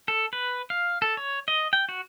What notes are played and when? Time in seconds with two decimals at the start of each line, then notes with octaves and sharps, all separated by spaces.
0.08 A4
0.33 B4
0.70 F5
1.02 A4
1.17 C#5
1.48 D#5
1.73 G5
1.89 F#4